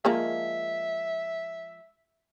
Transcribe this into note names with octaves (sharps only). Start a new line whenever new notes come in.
F3 G#3 A#3 E5